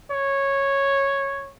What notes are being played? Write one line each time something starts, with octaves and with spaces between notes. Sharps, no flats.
C#5